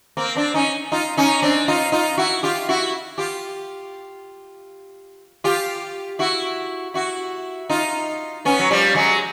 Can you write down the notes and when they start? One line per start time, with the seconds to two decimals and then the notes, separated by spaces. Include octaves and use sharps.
0.17 A#3 C4
0.35 C4 D4
0.54 C#4 D#4
0.92 D#4 F4
1.17 C#4 D#4
1.42 C4 D4
1.68 D#4 F4
1.92 D#4 F4
2.17 E4 F#4
2.43 F4 G4
2.69 E4 F#4
3.18 F4 G4
5.44 F4 G4
6.19 E4 F#4
6.94 E4 F#4
7.70 D#4 F4
8.45 B3 C#4
8.59 F#3
8.71 F3 G3
8.95 F#3 G#3